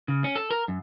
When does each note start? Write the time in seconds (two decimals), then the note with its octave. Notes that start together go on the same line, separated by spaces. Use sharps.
0.08 C#3
0.24 C#4
0.36 A4
0.51 A#4
0.68 F#2